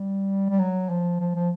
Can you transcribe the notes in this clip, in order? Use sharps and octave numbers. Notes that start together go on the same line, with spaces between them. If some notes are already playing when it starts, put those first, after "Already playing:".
Already playing: G3
G3
F#3
F3
F3
F3